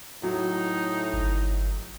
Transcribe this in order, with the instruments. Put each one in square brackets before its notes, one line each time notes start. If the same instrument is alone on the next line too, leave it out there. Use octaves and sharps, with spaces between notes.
[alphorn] A2 [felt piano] F#3 [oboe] D#4
[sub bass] G1